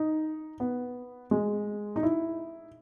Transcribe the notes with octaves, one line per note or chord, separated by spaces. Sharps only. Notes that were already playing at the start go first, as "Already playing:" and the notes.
Already playing: D#4
B3
G#3
D#4
E4